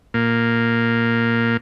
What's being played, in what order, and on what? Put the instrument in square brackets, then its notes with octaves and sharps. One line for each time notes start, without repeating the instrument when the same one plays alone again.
[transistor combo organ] A#2 A#3